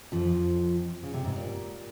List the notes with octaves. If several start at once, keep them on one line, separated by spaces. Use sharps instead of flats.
F2 F3
C#3
C3
G#2
A#2